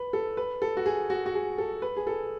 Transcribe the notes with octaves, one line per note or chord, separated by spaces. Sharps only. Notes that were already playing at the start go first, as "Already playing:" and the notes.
Already playing: B4
A4
B4
A4
F#4
G#4
F#4
F#4
G#4
A4
B4
G#4
A4